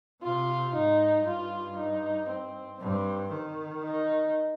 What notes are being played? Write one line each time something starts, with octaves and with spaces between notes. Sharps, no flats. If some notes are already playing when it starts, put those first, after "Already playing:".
C3 F4
G#2 D#4
G2 F4
D#4
C4
G2 C4
D#3
D#4